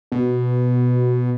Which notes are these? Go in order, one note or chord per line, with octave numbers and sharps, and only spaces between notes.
B2